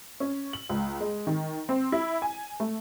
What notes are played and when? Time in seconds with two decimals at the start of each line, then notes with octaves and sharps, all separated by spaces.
0.20 C#4
0.53 F#7
0.69 C#2
1.00 G#3
1.27 D#3
1.69 C4
1.92 E4
2.22 G#5
2.60 A3